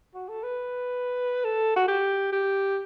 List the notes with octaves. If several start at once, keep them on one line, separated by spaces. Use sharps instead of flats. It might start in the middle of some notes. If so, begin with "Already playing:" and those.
F#4
A4
B4
A4
F#4
G4
G4